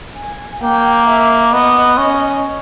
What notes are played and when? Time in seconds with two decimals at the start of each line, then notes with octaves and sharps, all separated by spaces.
0.18 G#5
0.63 A#3 G5
1.08 E5
1.52 B3 D#5
1.97 C#4